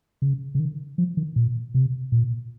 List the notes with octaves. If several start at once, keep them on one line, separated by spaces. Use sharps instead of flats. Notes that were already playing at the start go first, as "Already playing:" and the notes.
C#3
C#3
D#3
F3
D#3
A#2
C3
A#2